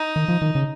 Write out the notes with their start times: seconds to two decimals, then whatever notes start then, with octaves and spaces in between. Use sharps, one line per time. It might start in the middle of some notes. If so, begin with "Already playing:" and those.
Already playing: D#4
0.16 D#3
0.28 F3
0.42 D#3
0.55 C#3